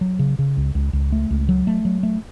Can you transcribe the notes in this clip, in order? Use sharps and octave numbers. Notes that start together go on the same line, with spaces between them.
F#3
C#3
C#3
C#2
C#2
C#2
A3
C#2
F#3
A3
F#3
A3